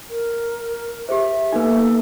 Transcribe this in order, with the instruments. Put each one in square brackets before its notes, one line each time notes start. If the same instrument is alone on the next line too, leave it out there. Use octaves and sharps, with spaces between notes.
[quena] A#4
[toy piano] G4 G#4 C5 [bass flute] E5
[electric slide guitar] A#3 B3 G#5 [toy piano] D#4 B4 [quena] A4